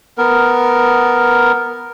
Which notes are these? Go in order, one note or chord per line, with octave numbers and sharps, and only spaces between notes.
B3 A#4